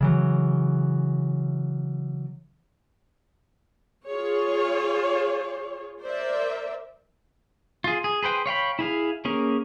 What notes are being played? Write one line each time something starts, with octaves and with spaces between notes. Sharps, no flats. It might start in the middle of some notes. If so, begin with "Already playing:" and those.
C#3 E3 F#3
F4 G#4 C#5
A#4 C5 D5 E5
F4 G#4
G#4
G#4 B4 C5 G5
C#5 F5 G5 B5
E4 G#4 F5
A#3 C#4 G#4 A#4